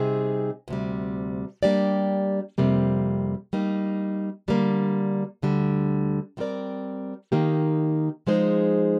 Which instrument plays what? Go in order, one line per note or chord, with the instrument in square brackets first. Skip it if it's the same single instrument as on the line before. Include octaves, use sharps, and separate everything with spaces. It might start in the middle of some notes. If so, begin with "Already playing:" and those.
Already playing: [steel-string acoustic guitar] C3 G3 C4 D#4 G#4
D2 C3 G3
G3 A#3 D4 G4 D5
F2 C3 G3 A#3
G3 A#3 D#4
D3 G3 A#3
D2 D3 G3
G3 C4 F4 A#4 D5
D#3 A#3 D#4 G4
F3 G#3 D#4 G#4 C5